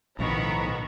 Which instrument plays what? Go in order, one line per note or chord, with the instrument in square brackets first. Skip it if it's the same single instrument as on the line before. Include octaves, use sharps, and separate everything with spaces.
[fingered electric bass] B1 [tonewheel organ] A2 F3 [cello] D#3 B3 [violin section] A#5 B5 C#6